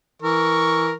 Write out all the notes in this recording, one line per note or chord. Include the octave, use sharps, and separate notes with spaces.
E3 A#4 C#6